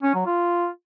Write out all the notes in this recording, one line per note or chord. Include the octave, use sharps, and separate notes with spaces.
C#4
F#3
F4